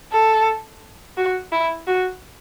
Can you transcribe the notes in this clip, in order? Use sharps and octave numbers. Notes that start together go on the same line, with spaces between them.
A4
F#4
E4
F#4